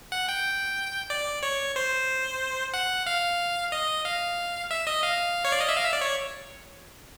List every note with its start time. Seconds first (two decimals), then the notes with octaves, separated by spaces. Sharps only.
0.12 F#5
0.29 G5
1.10 D5
1.43 C#5
1.76 C5
2.74 F#5
3.06 F5
3.72 D#5
4.05 F5
4.71 E5
4.87 D#5
5.03 F5
5.45 C#5
5.52 D5
5.61 D#5
5.69 E5
5.77 F5
5.84 E5
5.93 D5
6.01 C#5